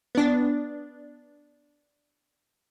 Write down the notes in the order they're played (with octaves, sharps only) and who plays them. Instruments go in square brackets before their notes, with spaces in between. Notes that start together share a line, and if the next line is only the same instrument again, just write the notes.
[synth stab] B3 D4